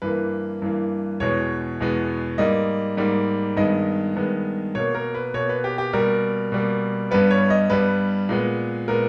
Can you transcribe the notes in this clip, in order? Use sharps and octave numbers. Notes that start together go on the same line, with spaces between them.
G2 E3 A#3 B4
G2 E3 A#3
E2 B2 G#3 B3 C#5
E2 B2 G#3 B3
G#2 G3 A#3 D#5
G#2 G3 A#3
G2 D#3 G#3 B3 D#5
G2 D#3 G#3 B3
B2 A#3 C#5
A#4
B4
B2 A#3 C#5
B4
G4
G4
B2 G3 A#3 A#4
B2 G3 A#3
G2 G3 B3 B4
C#5
D#5
G2 G3 B3 B4
A#2 G#3 B3
A#2 G#3 B3 A#4